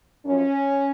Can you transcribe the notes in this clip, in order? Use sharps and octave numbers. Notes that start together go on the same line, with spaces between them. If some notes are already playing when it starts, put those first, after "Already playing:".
F#2 F3 C#4